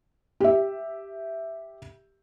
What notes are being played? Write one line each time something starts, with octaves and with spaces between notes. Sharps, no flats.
G4 E5